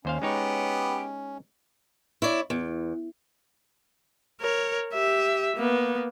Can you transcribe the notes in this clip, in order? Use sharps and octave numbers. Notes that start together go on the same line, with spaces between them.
D#2 C#4 C5 F5
G#3 B3 D#4 G4 C#5
E4 C#5 D5
E2
A#4 C#5
G4 E5
A#3 B3